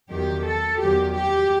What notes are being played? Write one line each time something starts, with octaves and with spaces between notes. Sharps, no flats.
E2 D#3 F#3 G4
A4
E2 D#3 F#3 G4
G4